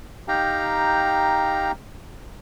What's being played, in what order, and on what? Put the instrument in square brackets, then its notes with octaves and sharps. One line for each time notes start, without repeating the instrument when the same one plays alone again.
[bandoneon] D#4 G4 F5 G5 A#5